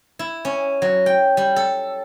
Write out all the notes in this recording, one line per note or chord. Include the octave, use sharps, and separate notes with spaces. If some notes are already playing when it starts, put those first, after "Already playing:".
E4
C#4
F#3
G5
G3
A4